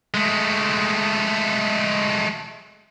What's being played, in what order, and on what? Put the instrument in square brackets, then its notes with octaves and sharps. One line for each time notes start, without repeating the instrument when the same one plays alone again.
[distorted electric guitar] G#3 A3